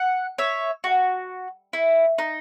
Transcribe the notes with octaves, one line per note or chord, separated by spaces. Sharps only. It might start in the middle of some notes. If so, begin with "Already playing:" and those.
Already playing: F#5
C#5 E5
F#4
E4
D#4